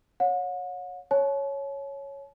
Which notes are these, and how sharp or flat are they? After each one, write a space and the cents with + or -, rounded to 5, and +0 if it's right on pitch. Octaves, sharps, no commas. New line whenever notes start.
C#5 +0 F#5 -40
C#5 +0 A5 -40